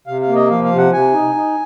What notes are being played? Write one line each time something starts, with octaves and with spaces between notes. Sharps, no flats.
C3 F5
F5
A#3
D#5
F3 F5
F5
C3
F#5
C3 G#5
D#4
D#4